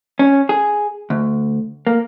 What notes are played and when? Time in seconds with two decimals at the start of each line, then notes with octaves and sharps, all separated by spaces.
0.19 C#4
0.49 G#4
1.10 D2
1.87 A#3